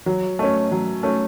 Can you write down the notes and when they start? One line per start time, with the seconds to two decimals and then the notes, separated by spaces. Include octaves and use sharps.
0.06 F#3
0.39 A3 C#4
0.72 F#3
1.03 A3 C#4